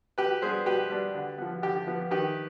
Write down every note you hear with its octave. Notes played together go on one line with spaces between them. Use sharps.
B2 G4 B4
G3 B3 D4 G#4 C5
B2 G4 B4
G3 B3 D4
D3
F3 B3
D3 G4
F3 B3
D#3 G4 B4